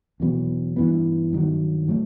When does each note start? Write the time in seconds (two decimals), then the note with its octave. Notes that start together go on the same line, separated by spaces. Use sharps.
0.20 E2 B2 F#3 B3
0.76 G2 E3 B3
1.33 G2 D#3 F#3
1.88 A2 F#3 A3